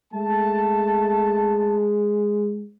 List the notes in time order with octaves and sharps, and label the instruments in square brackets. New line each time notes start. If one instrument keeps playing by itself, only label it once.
[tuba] G#3 [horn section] A3 A5